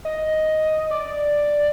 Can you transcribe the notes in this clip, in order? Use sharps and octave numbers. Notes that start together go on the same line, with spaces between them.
D#5
D5